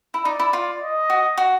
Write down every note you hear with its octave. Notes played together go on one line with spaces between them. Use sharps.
E4
D#4 D5
E4
F4
D#5
F#4
F#4